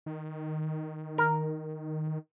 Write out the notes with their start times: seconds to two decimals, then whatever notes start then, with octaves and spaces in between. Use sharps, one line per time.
0.06 D#3
1.18 A#4